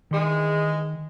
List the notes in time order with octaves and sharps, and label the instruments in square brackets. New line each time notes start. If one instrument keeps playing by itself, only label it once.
[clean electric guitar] D#3 C6 [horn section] E3 G#3